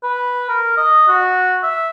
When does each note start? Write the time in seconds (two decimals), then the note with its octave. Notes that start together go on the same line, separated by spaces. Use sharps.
0.03 B4
0.49 A#4
0.77 D#5
1.08 F#4
1.63 E5